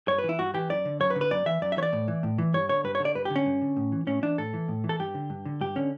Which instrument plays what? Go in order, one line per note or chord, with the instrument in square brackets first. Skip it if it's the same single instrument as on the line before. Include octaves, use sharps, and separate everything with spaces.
[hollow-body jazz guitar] G2 C#5
B4
E3
E4
G2 F#4
E3 G4
F#2 D5
D3
F#2 C#5
B4
D3
B4
F#2 D5
E3 E5
F#2 D5
E5
E3 C#5
D5
A2
E3
A2
E3
G2 C#5
D3 C#5
G2 B4
C#5
D3
D5
G2 B4
G4
D3
C#4
G2
D3
A2
E3
A2 C#4
E3 D4
A2 A4
E3
A2
E3
A4
G2 G4
D3
G2
D3
G2 G4
D3 C#4